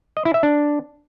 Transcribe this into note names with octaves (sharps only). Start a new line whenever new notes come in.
D#5
E4
E5
D4